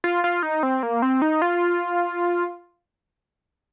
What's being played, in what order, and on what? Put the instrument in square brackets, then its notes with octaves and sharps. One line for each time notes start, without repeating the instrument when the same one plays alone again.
[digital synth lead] F4
F4
D#4
C4
A#3
C4
D#4
F4